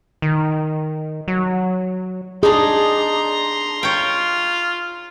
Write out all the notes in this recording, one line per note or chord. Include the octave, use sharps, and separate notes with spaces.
D#3
F#3
D4 D#4 G#4 A#5 C6
F4 C#5 G5